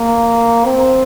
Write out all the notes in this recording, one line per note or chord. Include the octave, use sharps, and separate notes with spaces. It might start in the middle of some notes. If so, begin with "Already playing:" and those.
Already playing: A#3
C4